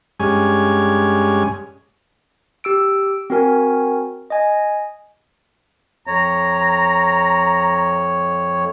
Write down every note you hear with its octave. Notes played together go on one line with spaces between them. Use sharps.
G2 G#3 C#4 G#5
G4 E6 D7
C4 F#4 A#4 G#5
D#5 G#5
F2 C#5 A#5